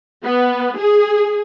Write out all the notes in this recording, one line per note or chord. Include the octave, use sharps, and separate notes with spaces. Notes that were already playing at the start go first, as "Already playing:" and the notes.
B3
G#4